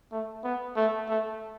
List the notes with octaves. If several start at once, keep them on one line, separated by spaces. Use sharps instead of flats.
A3
B3
A3
A3